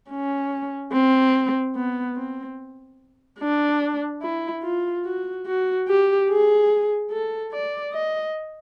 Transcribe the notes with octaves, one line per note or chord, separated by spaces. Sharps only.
C#4
C4
B3
C4
D4
E4
F4
F#4
F#4
G4
G#4
A4
D5
D#5